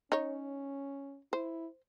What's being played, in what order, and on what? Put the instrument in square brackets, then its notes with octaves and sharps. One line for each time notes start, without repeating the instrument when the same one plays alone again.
[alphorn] C#4 [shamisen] D#4 C#5
[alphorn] E4 [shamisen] C5